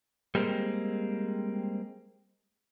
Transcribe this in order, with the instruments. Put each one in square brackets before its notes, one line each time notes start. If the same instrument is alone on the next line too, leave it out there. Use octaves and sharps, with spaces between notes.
[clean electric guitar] G3 G#3 A#3 C4